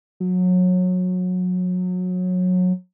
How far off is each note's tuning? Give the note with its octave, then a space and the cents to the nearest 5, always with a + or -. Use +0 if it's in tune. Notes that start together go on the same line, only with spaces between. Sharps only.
F#3 -25